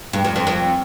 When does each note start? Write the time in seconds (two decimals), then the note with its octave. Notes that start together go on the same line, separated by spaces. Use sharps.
0.13 G2
0.24 F2
0.36 F2
0.47 F2